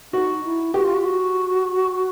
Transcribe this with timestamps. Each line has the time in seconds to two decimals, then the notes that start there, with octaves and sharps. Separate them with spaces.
0.13 D#4 F#4
0.45 E4
0.74 F#4 G4
0.85 F4
0.94 F#4
1.01 F4
1.05 F#4